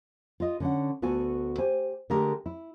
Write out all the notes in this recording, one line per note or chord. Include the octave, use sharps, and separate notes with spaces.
F4 D#5
D3 C#4 F#5
D2 B3 F#4 A4 G#5
G4 C5 G#5
D3 G#3 A3 G4 G#4 A#4
E4